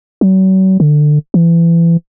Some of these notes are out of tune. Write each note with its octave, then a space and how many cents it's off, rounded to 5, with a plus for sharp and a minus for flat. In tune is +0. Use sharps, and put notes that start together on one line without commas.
F#3 +40
D3 +20
E3 +30